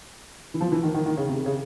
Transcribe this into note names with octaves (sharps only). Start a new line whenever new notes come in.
E3
F3
E3
D#3
D#3
D#3
C#3
C3
C#3